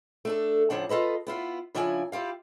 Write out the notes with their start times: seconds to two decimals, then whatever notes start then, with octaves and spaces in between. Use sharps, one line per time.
0.25 A3 D4 A4
0.70 A2 C#3 F3 D4 F#5
0.89 F4 A4 B4 D#5
1.27 B3 E4 F4
1.75 C#3 F3 D4 E4 D#5 G#5
2.12 E4 F4 G4 F5